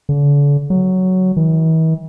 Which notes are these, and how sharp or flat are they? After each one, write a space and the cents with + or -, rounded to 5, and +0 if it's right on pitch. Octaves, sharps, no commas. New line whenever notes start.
D3 -40
F#3 +5
E3 -45